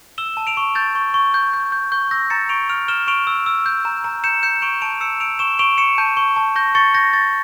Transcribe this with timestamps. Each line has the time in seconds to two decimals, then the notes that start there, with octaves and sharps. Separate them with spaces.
0.18 E6 E7 G7
0.37 A5
0.47 D7 F7
0.57 C#6
0.75 G6 A6
0.95 C#6
1.14 C#6
1.34 G6
1.53 G6
1.72 G6
1.92 C#6 G6
2.11 E6 G6 A#6
2.30 A#5 A6 C#7
2.49 C#6 D7 F7
2.69 F6 D7 F7
2.88 F6 E7 G7
3.07 C#6 D7 F7
3.27 E6
3.46 E6
3.66 G6
3.85 A#5
4.04 A#5
4.24 G6 C#7 E7
4.43 G6 C#7 E7
4.62 C#6 D7 F7
4.82 A5 D7 F7
5.01 E6 C#7 E7
5.20 E6 D7 F7
5.39 C#6 E7 G7
5.59 C#6 D7 F7
5.78 C#6 C#7 E7
5.98 A5 G6
6.17 C#6
6.36 A5
6.56 C#6 G6 A#6
6.75 C#6 A6 C#7
6.94 C#6 G6 A#6
7.13 C#6 A6